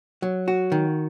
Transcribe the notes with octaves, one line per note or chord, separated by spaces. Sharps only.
F#3
F#4
D#3